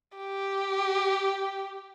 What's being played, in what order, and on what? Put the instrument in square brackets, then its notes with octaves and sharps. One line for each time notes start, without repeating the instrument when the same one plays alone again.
[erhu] G4